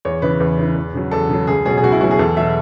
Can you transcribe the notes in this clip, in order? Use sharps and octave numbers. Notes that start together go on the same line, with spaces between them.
E2 C#5
C#3 E3 B4
E2
C#3 E3
E2
C#3 F#3
E2 A4
C#3 F#3
C#2 G#4
B2 F#3 G#4
G#4
C#2 F#4
E4
B2 F#3 F#4
G#4
E2 A4
B2 F#3 E5